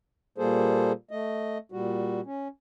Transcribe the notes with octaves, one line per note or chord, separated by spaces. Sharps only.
A#2 G3 A#3 G#4 A4 C5
A3 D#5
A#2 G3 F#4
C#4